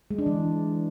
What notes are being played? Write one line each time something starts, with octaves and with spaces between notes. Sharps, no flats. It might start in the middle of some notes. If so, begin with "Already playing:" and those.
G#3
D4
E3